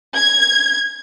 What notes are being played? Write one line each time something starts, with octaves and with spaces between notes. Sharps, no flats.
G#6